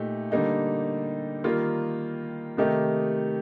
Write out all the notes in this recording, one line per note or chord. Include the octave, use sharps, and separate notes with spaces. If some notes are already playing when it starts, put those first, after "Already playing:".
Already playing: A#2 A3 D#4 G4
D3 G3 A#3 D#4 G4
D#3 G3 A#3 F4
C3 D#3 A3 D#4 G4